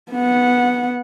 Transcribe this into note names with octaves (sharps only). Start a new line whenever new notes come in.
B3 F#5